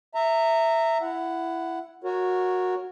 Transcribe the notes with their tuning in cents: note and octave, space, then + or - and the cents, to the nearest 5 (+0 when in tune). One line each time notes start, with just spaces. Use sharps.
E5 +0 A#5 -25
E4 +15 F#5 +0
F#4 -15 A#4 +0 C#5 +0